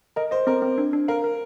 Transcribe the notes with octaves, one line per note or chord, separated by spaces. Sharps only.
A#4 D#5
C5 D#5
C4 A#4
C4
D4
D4
A#4 F5
A#4